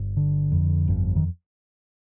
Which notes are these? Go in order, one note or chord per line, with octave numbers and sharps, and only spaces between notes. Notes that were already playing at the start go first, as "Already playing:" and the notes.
Already playing: G1
D3
F2
G1
D#3